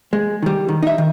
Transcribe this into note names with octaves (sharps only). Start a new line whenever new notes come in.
G#3
D#3 G3
D#3
D#4 E5
D#3